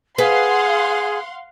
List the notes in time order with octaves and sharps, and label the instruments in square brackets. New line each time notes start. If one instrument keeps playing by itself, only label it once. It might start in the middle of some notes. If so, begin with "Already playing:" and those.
[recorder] G#4 [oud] B4 [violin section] F5 F#5 C6